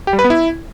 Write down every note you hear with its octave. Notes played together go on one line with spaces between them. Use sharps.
G4
G3
B4
B3
E4